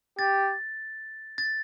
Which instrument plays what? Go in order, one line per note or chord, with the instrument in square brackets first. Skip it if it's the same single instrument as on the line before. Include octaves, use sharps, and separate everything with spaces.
[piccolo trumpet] G4 [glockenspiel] A6
[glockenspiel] A6